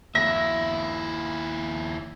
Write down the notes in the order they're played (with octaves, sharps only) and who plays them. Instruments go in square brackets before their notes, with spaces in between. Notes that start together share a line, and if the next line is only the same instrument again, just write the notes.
[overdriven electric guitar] D#2 E4 [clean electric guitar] E5 [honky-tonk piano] A#6